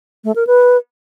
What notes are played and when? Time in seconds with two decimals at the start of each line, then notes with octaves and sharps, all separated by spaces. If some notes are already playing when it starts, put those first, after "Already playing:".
0.24 A3
0.36 A#4
0.47 B4